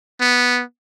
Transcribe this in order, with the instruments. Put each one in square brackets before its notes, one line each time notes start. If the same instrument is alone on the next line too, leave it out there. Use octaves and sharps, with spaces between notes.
[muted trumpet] B3